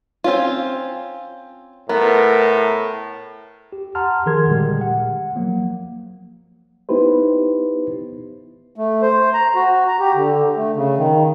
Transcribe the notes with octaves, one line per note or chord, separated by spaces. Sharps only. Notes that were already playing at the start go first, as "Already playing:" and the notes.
C4 C#4 F4
A2 B3 A#4
G4
F#5 A5 A#5 C6 F6
D#3 F3 G#4 A#4 C6 G#6
A#2 D3 G3 G#3 G4
F#5
F3 F#3 A#3
B3 D#4 E4 G4 B4 C5
A3
C5
A#5
F#4
A#5
G4
D3
A3
C#3
D#3